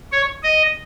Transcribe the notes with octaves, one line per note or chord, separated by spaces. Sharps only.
C#5
D#5